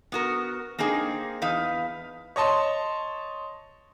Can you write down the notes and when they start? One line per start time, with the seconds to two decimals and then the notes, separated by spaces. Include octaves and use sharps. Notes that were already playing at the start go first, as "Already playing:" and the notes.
0.12 B3 F#4 A#4
0.79 A#3 C4 D#4 G#4
1.42 E2 D#4 B4 F5
2.36 C#5 D#5 A5 C6